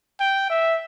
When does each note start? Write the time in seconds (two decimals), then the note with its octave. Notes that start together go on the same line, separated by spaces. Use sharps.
0.20 G5
0.50 E5